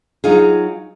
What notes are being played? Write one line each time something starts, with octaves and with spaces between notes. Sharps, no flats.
F#3 D#4 F4 G#4